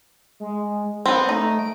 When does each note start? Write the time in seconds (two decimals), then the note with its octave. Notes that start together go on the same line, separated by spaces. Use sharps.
0.40 G#3
1.06 B3 C4 B5
1.29 A3 D#4
1.59 D7